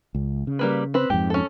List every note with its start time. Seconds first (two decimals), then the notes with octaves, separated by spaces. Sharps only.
0.15 C#2
0.47 C#3
0.59 G3 A#3 B4
0.94 C4 B4
1.10 F2 G#2 G4
1.30 C#4 A4